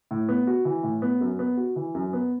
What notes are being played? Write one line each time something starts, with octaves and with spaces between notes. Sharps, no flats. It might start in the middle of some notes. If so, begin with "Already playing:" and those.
A2
B3
F#4
E3
A2
B3
F#2
B3
F#4
E3
F#2
B3